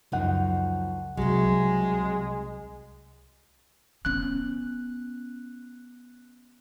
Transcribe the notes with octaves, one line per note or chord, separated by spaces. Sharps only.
C#2 F#2 F3 D#4 F#5
C2 C3 F#3 G#3
B3 C#4 F#6